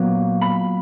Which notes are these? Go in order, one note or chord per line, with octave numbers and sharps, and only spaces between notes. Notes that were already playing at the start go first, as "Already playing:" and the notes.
Already playing: A#2 F#3 B3
B5